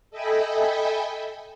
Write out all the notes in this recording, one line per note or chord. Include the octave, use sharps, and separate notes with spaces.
A4 D#5 E5 G5 G#5 B5